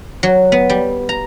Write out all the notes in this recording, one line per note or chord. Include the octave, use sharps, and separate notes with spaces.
F#3
B3
G3
A#5